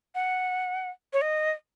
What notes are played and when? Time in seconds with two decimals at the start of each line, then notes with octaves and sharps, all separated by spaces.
0.15 F#5
1.13 C#5
1.21 D#5